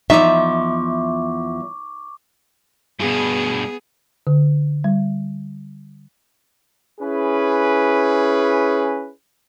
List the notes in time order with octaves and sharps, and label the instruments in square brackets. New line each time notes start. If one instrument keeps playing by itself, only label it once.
[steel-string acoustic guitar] E2 F3 [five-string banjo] D#4 D#5 [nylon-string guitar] E5 [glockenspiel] C#6 D6
[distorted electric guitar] G2 B2 [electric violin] B3 G#4
[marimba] D3
G3
[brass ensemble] C#4 E4 G#4 B4